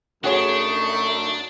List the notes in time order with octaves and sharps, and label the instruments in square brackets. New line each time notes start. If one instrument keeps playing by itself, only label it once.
[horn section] F#2 A3 D#4 [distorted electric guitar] D4 [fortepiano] F#4 G#4 C#5